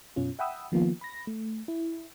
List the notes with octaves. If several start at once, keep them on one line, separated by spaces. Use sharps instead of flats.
F#2 B2 C#4 F4
E5 F#5 G5 B5 D#6 E6
D#3 F3 A#3 B3 F4
B5 A#6
A3
E4